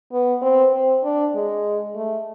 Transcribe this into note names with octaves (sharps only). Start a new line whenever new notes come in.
B3
C4
C4
D4
G#3
A3